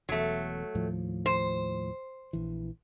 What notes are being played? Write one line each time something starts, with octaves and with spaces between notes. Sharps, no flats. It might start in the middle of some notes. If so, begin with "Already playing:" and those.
E1 E2 F#3 A3
D#2 A2 F3
C5
A#1 E3